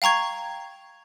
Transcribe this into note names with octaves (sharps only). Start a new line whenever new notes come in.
F5 G5 A#5 C#6 G#6